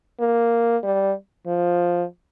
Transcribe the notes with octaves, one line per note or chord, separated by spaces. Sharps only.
A#3
G3
F3